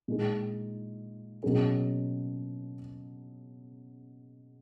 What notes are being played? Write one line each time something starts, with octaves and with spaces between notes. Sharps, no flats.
A#2 G#3 D#4 G#4
B2 F#3 A#3 C#4 G#4